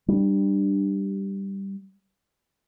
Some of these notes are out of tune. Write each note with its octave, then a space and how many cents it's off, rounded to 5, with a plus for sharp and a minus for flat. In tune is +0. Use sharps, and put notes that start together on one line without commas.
G3 +0 D4 +15